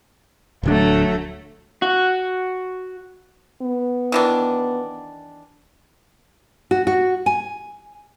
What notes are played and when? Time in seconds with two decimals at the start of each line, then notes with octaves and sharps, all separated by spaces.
0.63 D1 D2 F#3 A3 D4
1.82 F#4
3.62 B3
4.12 D#3 E3 D4
6.71 F#4
6.87 F#4
7.26 G#5